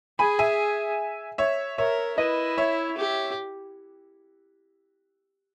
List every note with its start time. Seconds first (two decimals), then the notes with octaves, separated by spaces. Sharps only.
0.19 G#4 G#5 B5
0.39 E5 G#5
1.38 C#5 E5
1.78 A#4 C#5 E5
2.18 E4 B4 D#5
2.58 C#5 E5
2.97 G4